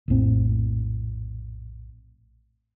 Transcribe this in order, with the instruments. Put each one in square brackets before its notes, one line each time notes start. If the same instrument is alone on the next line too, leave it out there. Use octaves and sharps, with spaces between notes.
[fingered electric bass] A#1 F2 A2 C4